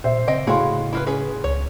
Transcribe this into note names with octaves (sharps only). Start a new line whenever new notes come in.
A#2 C5 E5
C#3 C4 D#5 G5
A2 E4 F#4 G#4 F5 C6
E4 F4 B4
C#4 G#4 B4
C#2 C#5